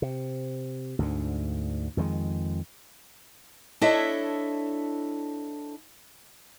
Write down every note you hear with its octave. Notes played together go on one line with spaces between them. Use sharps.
C3
D2 G#2 D3
F2 D#3 E3 G#3
D4 E4 A4 C#5 D#5 E5